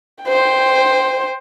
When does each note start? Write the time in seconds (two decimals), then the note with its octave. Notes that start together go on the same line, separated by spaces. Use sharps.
0.24 C5 G5